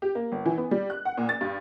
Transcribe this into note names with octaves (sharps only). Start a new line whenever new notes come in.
G4
A#3
G1
E3
B3
G3
F#6
F#5
A#2
A6
G2